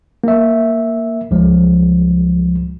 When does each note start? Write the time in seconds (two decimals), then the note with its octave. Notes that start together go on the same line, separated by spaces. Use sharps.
0.24 A#3 E5
1.31 C#2 F3 G#3